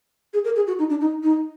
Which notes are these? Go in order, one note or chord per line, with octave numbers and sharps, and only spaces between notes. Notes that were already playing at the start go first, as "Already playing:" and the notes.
G#4
A#4
G#4
F#4
D#4
D4
D#4
D#4